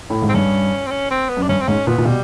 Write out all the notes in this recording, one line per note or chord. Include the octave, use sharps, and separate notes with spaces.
A2
G#2
C4
G2 C#4
C4
C#4
C4
B3
F#2
D4
G2 C#4
C4
G#2 C#4
A#2 B3
A#2
B2 G3